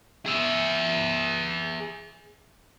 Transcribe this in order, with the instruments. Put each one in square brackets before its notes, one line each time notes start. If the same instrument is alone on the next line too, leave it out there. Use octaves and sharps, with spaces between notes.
[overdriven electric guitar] G#4 E5